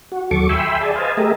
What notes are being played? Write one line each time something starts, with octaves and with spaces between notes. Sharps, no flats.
F#4
D#2 F#3 A4 C#6 D6
E5 G5 G#5 B5 C6 E6
G#4 D5 G#5 A5
B4 C5 D#5 F5 G#5 A5
A3 G4 G#4 A#4 D#5 E5